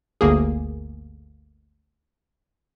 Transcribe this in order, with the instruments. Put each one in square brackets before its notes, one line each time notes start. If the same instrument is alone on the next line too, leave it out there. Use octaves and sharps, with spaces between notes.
[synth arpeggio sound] G1 D2 A#3 G#4